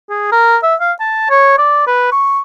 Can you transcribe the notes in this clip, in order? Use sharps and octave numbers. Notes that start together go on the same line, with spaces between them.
G#4
A#4
E5
F5
A5
C#5
D5
B4
C#6